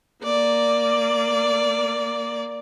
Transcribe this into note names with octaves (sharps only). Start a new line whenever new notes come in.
A#3 D5